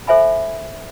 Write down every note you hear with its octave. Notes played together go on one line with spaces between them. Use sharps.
A4 C5 E5 G#5 B5